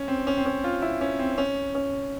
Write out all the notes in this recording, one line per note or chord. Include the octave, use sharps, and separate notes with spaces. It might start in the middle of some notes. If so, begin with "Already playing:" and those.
Already playing: C#4
C4
C#4
C4
C#4
F4
E4
C#4
C4
C#4
C#4